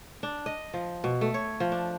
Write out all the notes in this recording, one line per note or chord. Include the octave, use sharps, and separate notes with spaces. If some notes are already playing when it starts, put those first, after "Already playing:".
D4
D#5
F3
B2
A3
C#5
F3
D4